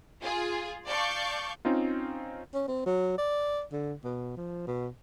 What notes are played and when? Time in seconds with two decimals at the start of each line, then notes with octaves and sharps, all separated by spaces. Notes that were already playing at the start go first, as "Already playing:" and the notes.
0.23 F4 G#4
0.86 D5 F5 A5 C#6 G6
1.65 C4 C#4 D#4 F4
2.54 C#4
2.68 C4
2.86 F#3
3.18 D5
3.72 D3
4.04 B2
4.37 F3
4.67 B2